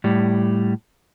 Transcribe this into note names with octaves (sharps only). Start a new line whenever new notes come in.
A2 G3